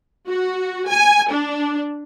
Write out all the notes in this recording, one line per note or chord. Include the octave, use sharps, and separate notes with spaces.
F#4
G#5
D4